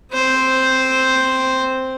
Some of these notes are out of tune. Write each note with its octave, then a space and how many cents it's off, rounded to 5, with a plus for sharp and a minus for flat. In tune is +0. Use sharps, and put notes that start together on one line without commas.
C4 +0 C5 +0